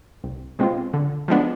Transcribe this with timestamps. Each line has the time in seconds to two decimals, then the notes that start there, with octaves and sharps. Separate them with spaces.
0.24 C2
0.59 B2 G#3 C4 F4
0.93 D3
1.28 F3 G#3 B3 D4